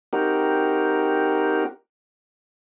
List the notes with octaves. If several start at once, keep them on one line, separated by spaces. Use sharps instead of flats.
C4 D#4 F#4 G4 A#4